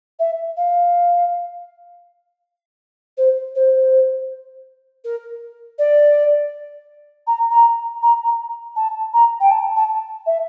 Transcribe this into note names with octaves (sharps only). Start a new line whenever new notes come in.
E5
F5
C5
C5
A#4
D5
A#5
A#5
A#5
A#5
A5
A#5
G5
A5
A5
E5